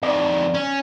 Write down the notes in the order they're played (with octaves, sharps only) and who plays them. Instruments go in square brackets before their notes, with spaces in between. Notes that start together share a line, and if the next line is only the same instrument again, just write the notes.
[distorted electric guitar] F2 D#3 [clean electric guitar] D5
[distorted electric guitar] C#4